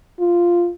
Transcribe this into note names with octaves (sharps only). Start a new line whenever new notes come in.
F4